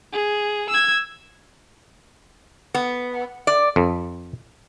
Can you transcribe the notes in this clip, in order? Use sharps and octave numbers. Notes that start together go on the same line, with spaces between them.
G#4
E6 G#6
B3
D5
F2